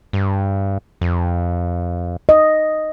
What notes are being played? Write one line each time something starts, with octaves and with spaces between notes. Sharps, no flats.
G2
F2
D#5